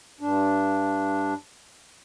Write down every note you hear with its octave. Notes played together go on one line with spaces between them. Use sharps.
G2 D4